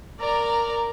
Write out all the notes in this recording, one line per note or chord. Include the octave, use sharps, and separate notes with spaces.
A#4 D5 A#5